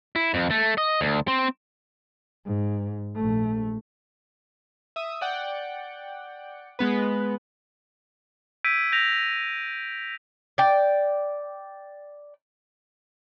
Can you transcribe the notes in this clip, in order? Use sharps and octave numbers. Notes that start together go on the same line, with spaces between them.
E4
F2
A3
D#5
D2
C4
G#2
A#1 A3
E5 D#6
D5 F#5 G5
G#3 B3 B4
E6 G6 G#6 B6 D7 D#7
G6 A#6 F7
D5 G5